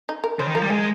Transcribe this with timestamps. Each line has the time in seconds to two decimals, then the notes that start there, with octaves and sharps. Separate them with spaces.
0.09 D#4
0.24 A#4
0.39 C#3 C5
0.47 D#3
0.54 F3 A#4
0.62 G3
0.70 G#3 G#4